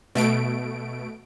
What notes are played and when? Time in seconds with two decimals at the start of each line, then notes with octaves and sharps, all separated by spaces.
0.15 B2 A3 D7